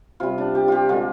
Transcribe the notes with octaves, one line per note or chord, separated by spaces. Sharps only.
C3 G3 F4
D4
G4
F4 G4
D3 G#3 F4